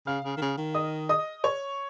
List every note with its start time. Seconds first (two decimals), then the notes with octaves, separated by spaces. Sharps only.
0.07 C#3 F5 F6
0.24 C#3
0.37 D#3
0.42 C#3
0.57 D#3
0.75 D#5 D#6
1.09 D#5 D#6
1.44 C#5 C#6